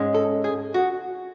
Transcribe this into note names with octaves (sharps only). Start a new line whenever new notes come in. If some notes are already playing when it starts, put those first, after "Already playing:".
Already playing: G#2 G#3 C#4
A4
G#4
F#4